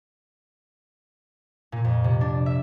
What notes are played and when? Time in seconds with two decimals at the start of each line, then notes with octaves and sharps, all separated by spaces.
1.72 A#2
1.84 F2
2.04 C3
2.21 D4
2.46 E5